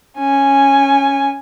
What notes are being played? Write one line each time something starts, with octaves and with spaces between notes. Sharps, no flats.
C#4 G#5